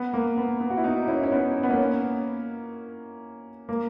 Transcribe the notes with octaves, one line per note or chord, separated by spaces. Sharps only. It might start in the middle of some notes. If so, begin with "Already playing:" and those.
Already playing: B3
A#3
B3
B3
F#4
E4
B3 D#4
C#4 E4
C#4
B3 D#4
C#4
B3
A#3 C#4
A#3